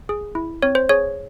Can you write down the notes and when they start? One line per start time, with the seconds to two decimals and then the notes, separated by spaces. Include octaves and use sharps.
0.09 G#4
0.35 E4
0.62 C4 C#5
0.75 C5
0.89 G#4 C#5